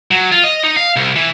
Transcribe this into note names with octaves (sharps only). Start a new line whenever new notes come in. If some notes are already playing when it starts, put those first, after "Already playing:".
F#3
F4
D#5
D#4
F5
C2
E3